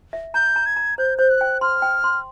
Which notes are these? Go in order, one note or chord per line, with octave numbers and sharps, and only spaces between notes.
E5
A#5 G6
A#5
G#6
A#5
C5 G6
C5 G6
F#6
G5
C6 F6
G5
C6